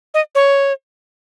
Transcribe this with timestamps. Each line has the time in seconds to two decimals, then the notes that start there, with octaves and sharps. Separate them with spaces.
0.14 D#5
0.35 C#5